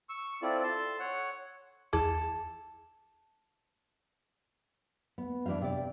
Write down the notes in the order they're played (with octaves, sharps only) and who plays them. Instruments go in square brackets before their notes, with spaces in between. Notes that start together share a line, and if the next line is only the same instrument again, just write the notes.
[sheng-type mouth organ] C#6 E6
C4 E4 F4 A4 D5
A4 A5 C6 E6
C#5 F#5
[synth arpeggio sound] E2 G#4 D6 [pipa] A4
[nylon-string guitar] B3
E3 D4 E4 F#4 F5
C3 D5